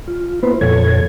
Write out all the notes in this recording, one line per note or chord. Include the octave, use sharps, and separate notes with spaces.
F4
A#3 B3 E4 B4 C5
F2 A#2 F3 A4 C#5 G#6